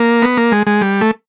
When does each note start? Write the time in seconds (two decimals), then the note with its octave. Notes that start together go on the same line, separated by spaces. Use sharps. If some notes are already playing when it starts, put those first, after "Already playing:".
Already playing: A#3
0.22 B3
0.37 A#3
0.52 G#3
0.67 G#3
0.81 G3
1.01 A3